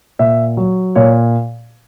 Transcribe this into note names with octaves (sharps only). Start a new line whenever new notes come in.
A#2 E5
F#3
A#2 C#5